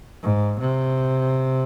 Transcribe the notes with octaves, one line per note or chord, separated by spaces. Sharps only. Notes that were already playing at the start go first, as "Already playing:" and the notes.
G#2
C3